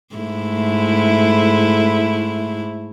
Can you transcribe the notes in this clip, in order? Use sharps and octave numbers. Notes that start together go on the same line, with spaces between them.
G#2 A3 E4